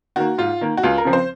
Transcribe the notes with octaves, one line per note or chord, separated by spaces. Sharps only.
D#3 A#3 F#4
G#2 F4
D#3 A#3
F#4
C#2 F4
A#4
C#3 F3 C4
C5